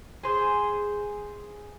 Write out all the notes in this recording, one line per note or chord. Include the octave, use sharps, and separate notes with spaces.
G#4 C5